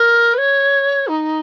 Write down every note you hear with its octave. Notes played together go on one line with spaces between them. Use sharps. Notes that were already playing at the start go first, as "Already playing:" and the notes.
Already playing: A#4
B4
C#5
D#4